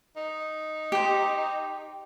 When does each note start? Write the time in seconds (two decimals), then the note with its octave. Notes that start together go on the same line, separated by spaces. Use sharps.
0.16 D#4
0.92 G4 C5